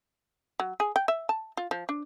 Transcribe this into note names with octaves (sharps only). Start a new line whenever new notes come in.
F#3
G#4
G5
E5
A5
F4
F3
D4